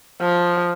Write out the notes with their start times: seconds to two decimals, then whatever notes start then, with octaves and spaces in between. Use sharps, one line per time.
0.21 F3